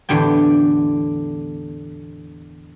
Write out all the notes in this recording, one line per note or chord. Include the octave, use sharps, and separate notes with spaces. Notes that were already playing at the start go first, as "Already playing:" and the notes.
E2 A2 D3 G4 G5